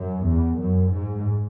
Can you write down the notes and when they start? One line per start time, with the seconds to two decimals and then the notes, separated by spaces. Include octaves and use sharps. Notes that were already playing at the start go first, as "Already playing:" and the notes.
Already playing: F#2
0.26 E2
0.59 F#2
0.93 G#2